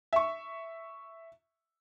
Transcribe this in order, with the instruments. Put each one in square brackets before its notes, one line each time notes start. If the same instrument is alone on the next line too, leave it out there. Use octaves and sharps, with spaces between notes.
[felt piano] E5 C#6